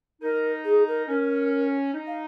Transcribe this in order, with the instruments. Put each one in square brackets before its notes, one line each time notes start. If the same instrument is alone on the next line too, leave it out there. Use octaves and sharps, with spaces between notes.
[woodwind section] D#4 [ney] A#4
[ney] G#4
A#4
[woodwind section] C#4 [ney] A#4
[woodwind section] D#4
[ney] F5